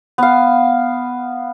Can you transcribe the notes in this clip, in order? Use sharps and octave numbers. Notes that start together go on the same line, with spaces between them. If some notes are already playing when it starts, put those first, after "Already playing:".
B3 F5